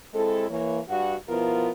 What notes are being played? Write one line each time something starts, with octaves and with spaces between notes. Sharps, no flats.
G#3 C4 E4 A4
E3 A#3 C#5
G2 F#4
B2 F3 B3 E4 F4 A#4